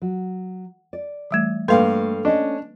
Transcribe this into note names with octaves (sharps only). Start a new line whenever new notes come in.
F#3
D5
E3 G3 A3
G2 A3 A#3 B4 F5 C6
C#4 D4 D#5